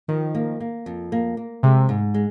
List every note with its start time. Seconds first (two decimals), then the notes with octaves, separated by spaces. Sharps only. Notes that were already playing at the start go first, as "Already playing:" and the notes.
0.08 D#3 F3
0.35 A#3
0.60 A#3
0.86 F2
1.12 A#3
1.37 A#3
1.63 C3 G#3
1.89 G#2
2.14 G#3